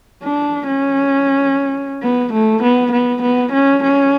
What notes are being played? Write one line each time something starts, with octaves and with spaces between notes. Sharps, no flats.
D4
C#4
B3
A3
B3
B3
B3
C#4
C#4